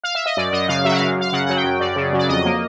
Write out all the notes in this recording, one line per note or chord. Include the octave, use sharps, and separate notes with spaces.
F5
E5
D#5
F#2 D5
F#2 D#5
C#3 F5
F#3 E5
F#5
F#2 F5
F#2 F5
C#3 F#5
F#3 F#5
G5
F#2
F#2 D5
C#3
F#3
D5
F2 D#5
A#3